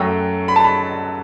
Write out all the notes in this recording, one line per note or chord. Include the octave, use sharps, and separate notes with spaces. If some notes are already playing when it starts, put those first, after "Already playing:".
Already playing: F#2 F#3 A3 G5
B5
A5
B5